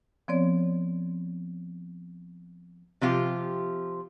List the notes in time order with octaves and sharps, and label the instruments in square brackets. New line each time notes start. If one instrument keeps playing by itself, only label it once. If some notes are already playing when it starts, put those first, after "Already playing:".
[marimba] F3 B3 C4 C#5 D5
[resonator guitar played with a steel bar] C3 F3 F4 G4